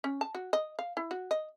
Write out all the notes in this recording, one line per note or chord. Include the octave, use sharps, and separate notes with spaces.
C#4
A5
F#4
D#5
F5
E4
F#4
D#5